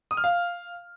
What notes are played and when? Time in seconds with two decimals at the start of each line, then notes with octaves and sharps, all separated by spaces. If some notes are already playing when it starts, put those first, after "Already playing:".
0.11 D#6
0.17 F6
0.24 F5